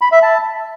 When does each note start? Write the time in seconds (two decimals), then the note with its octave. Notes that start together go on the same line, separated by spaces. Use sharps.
0.01 B5
0.12 E5
0.22 A5